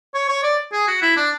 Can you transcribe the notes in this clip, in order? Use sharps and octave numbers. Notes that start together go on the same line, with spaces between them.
C#5
C#5
D5
G#4
F#4
E4
D4